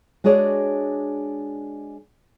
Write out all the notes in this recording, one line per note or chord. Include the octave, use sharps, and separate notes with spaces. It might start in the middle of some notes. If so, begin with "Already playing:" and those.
G#3 D4 F#4 G#4 C#5 D5